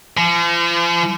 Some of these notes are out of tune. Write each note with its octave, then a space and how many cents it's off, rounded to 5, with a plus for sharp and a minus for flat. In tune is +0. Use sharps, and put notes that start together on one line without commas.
F3 -40